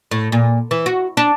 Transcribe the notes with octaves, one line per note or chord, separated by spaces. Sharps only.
A2
A#2
E3
F#4
D4